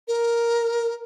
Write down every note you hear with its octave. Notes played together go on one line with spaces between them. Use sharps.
A#4